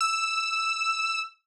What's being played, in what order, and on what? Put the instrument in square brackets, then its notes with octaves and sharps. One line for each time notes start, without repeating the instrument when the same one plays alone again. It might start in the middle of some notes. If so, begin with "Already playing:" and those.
[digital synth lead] E6